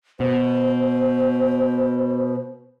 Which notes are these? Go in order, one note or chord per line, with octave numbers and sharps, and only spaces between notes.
B2 C5